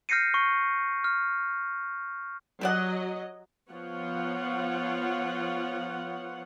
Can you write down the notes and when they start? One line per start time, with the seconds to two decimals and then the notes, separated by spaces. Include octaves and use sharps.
0.09 F6 G6 A#6 C7 C#7 D#7
0.34 C#6
1.04 F6
2.61 F#3 G4 D5 D#5 F#5
3.71 F3 B3 F4 C#5 F#5